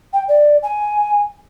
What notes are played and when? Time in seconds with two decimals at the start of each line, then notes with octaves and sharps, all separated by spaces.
0.13 G5
0.28 D5
0.62 G#5